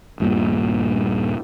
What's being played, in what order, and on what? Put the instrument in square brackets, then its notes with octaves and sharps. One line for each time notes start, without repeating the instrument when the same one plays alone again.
[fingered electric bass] D#1 G2 A#2